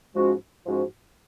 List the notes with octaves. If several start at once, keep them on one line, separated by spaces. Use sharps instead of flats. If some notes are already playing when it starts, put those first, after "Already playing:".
G#2 F3 G#3 C#4 F#4
G#2 F3 G#3 C#4 F#4